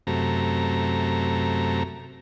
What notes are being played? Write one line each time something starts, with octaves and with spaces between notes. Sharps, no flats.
F#2 C3 A3 A#5